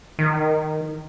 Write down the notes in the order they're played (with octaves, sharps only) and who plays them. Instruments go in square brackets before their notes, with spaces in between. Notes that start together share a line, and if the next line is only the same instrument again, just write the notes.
[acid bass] D#3